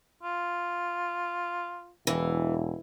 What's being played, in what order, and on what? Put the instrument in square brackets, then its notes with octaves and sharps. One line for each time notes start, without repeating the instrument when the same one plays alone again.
[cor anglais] F4
[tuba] E1 [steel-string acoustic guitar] E3